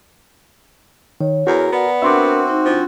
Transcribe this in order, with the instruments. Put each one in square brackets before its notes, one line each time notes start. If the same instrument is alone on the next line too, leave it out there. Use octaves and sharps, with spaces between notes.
[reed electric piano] D#3 [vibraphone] C#5
[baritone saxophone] E2 [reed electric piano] F#4 [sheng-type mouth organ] A#4
[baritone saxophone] B3 [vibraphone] D5 F#5
[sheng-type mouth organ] C4 F#4 [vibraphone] D4 A#4 [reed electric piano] E5 C6 D6
[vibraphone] D#4 C5
[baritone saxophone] F3 [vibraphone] D4 F4